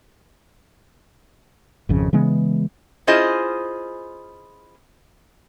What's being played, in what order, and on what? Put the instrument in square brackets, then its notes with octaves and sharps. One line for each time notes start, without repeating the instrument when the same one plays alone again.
[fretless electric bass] G#1 F2 C#3
C#3 E3 G#3 B3
[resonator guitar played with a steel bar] C#4 E4 F4 G#4 C5 D#5